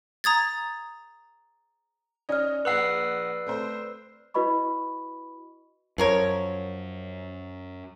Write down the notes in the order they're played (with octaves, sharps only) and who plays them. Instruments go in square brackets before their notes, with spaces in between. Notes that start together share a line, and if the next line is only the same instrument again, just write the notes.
[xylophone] A#5 D#6 G#6 A6
[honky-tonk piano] C#4 D#4 D#5 [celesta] D5 F6
[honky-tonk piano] A#1 F#5 F#7 [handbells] B4 E6 C7
[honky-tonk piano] A3 C4 C5
[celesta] E4 F#4 B4 D#5 B5 C#6
[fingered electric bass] F#2 [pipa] F3 A#4 C#5